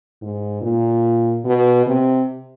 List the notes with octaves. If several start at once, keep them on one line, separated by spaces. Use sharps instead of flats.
G#2
A#2
B2
C3